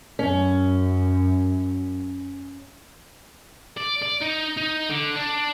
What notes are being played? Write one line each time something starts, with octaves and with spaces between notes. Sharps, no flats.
F#2 C#4
D5
D5
D#4
D#4
D3
D4